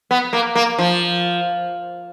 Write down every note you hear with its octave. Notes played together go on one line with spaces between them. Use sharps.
B3
A#3
A#3
F3